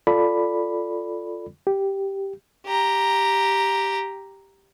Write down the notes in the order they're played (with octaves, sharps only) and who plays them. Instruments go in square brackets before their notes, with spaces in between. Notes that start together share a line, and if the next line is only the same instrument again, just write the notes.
[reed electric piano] F4 A4 D5 B5
G4
[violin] G4 A#5